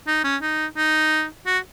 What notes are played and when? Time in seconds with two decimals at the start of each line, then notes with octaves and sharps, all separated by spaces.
0.07 D#4
0.24 C#4
0.42 D#4
0.77 D#4
1.46 F#4